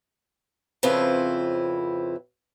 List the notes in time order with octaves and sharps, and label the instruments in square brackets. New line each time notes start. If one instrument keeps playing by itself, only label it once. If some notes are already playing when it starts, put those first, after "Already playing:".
[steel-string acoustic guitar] F2 C#3 C4 E4 F4 B4